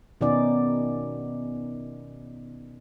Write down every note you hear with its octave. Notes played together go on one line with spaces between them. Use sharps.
B2 D#3 B3 C#4 D#4 D5